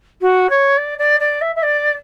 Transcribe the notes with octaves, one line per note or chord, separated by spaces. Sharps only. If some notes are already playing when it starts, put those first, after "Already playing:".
F#4
C#5
D5
D5
D5
E5
E5
D5